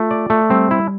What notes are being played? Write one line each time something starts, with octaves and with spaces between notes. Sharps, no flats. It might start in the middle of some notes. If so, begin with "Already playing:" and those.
Already playing: A3 F4
D5
A3
G3 C4
E4